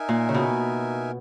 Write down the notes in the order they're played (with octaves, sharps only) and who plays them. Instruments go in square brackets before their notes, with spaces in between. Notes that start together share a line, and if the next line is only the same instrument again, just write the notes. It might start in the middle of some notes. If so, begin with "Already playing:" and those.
Already playing: [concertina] D#4 A#4 E5 G#5
[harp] A#2
C#3
B2